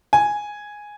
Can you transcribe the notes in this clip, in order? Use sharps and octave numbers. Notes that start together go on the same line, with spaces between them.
G#5